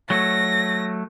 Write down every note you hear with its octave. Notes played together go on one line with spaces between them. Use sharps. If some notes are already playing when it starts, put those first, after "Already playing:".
F#3 A3 A#6